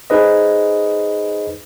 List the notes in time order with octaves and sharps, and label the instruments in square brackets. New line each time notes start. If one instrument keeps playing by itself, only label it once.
[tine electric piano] D#4 G#4 B4 C5 D#5